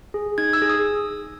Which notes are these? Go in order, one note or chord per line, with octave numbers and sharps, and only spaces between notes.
G#4
D#4 G#6
E6
G#4
D#6